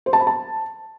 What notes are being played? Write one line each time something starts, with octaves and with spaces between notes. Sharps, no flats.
C5
A5
B5
A5